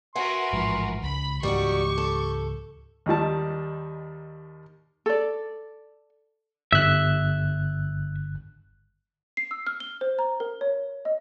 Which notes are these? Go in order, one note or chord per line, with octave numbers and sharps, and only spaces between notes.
F#4 A#4 B4 E5 F#5 G#5 C6
A1 G#2 F3
C#2 B5
C#2 G#2 E3 G3 D#4 F#4 G4 C#6
A4
D#2 D#3 G3 A5
A4 D5
G1 E5 F#6
C7
E6
F6
G7
C5
A#5
A#4
C#5
D#5